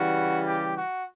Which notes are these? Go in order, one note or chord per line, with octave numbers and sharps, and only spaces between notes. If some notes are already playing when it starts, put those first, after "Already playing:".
Already playing: C#3 E3 G3 F#4
G4
F#4